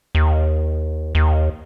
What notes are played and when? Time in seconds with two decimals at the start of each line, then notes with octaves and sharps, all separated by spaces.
0.15 D#2
1.15 D#2